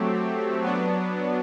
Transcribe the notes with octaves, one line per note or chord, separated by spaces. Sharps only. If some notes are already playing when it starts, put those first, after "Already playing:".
Already playing: F#3 A3 C4 G4
F#3 B3 D4